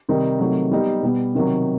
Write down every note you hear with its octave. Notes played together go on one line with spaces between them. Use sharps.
C3 D#3 G3 D#4
C3 D#3 F#3 A3
G3 B3 D#4 G4
B2 G3 B3
C3 D#3 F#3